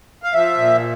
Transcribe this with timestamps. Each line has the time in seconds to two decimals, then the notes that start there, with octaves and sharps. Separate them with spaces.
0.23 F5
0.34 F3 E5
0.57 A#2